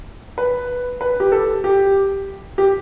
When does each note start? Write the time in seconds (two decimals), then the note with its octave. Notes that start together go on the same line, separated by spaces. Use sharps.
0.38 B4
1.01 B4
1.20 G4
1.32 A4
1.64 G4
2.58 G4